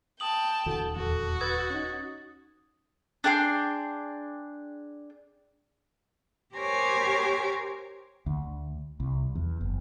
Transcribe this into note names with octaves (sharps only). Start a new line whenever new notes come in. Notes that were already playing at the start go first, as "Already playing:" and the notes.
G5 A5 D#6 F#7
D#1 D2 E3 F#4 A4
E2 F#4 A4
B4 D#6 E6 G#6 A6
C#4 D#4
D4 G#4 G5 C6
G4 A#4 C5 C#5 G#5 D6
D2
C2
E2
F#1